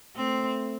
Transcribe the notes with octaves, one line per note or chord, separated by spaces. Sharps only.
A3 C4